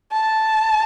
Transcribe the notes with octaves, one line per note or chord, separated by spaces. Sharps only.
A5